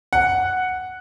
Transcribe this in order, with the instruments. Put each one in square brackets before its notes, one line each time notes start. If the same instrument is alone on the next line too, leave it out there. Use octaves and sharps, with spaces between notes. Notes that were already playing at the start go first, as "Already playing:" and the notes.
[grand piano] F#5